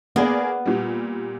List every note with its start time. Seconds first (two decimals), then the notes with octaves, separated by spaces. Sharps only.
0.16 A#3 B3 G#4 D5
0.66 A#2 G3